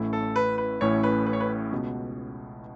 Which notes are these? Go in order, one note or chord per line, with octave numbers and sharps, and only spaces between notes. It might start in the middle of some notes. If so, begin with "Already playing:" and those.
Already playing: A1 A2 A3 C#4 E4
A4
B4
B4
A1 A2 A3 C#4 E4 C#5
B4
B4
C#5
B4
C#2 B2 B3